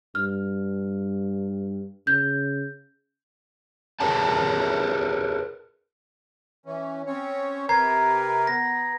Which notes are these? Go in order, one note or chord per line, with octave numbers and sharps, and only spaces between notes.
G2 F6
C#3 G6
G#4 A#4 B4 C#5 A5
E3 C#4
C4 C#4 C#5
C3 A#4 B4 A#5 G#6 C7
B3 A#6